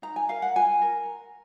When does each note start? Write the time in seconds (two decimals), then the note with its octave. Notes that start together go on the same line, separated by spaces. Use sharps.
0.02 D#4 A#5
0.16 G#5
0.29 A#4 F5
0.42 F#5
0.56 F4 G#5
0.82 A#4